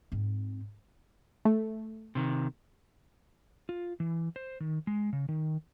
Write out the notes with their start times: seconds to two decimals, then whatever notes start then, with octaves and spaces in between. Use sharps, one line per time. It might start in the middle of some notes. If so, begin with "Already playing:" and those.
0.12 G#2 C4
1.45 A3
2.15 C3 D#3
3.69 F4
4.00 E3
4.36 C5
4.60 D#3
4.87 G#3
5.13 C#3
5.29 D#3